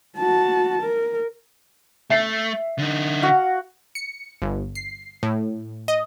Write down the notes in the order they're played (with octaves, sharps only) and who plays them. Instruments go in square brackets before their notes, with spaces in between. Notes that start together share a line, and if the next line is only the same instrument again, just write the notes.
[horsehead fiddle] F#4 A5
A#4
[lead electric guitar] A3 [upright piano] E5 C7
[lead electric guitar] D3 D#4
[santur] F#4 F5
[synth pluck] C#7
G1
C7
A2
D#5